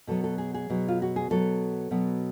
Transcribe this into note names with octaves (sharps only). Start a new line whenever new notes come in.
B2 F#3 B3 A4
A4
G#4
G#4
B2 F#3 B3
F4
F#4
G#4
B2 F#3 B3 A4
B2 F#3 B3